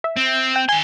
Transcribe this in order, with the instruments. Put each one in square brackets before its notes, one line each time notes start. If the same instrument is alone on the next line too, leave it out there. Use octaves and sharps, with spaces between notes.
[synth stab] E5
[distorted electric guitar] C4
[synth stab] G5
[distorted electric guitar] D#3 C6 [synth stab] G#5